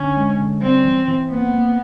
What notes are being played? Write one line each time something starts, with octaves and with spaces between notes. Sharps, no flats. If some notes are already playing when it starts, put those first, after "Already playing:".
Already playing: D3 C#4
G#3
D3
G3 C4
E3
E3
A#3 B3
A#3